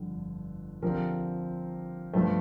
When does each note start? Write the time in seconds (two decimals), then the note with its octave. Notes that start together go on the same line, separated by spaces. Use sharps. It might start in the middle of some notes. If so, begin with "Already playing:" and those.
Already playing: G1 F2 D3
0.82 D3 F3 C4 G4 A#4
2.13 G2 F3 A3